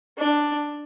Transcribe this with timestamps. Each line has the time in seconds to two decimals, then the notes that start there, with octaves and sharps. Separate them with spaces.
0.18 D4